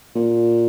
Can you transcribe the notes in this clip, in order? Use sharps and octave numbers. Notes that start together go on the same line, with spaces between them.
A#2